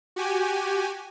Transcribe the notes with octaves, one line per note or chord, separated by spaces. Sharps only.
F#4 G4 G#5